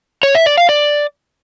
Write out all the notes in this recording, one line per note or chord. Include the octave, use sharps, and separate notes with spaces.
C#5
E5
D5
F5
D5